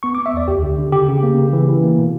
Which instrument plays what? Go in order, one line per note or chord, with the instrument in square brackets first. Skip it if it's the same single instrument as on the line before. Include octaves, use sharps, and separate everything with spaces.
[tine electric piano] B3 C#6
D6
B3
E5
E2 D5
D2 G4
D3
D3
C#3 G4
C#3
A#3
C#3
E3
E3
A#3
B2